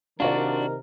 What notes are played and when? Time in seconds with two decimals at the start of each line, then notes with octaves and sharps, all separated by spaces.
0.20 C3 D#3 D4 F4 F#4 A#4 D5